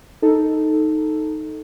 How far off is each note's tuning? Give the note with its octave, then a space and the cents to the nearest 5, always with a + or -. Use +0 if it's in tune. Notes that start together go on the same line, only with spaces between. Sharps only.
D#4 +0 A4 +0